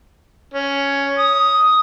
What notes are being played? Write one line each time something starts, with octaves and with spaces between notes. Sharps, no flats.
C#4
D#6